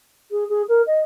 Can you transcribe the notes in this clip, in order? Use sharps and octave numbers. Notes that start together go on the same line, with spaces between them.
G#4
G#4
A#4
D#5